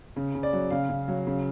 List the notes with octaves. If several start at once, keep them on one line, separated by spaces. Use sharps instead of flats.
C#3
C#3
D5
F#3
C#3 F5
C#3
F#3
C#3